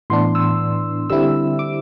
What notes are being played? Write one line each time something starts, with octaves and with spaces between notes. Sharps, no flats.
A2 E3 B3 D4 C6
E6
D3 G3 C4 E4 E6
D6